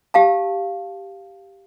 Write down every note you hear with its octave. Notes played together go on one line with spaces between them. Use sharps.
G4 F5 A5